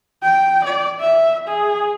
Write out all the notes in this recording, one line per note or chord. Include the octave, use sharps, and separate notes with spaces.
G5
D5
E5
G#4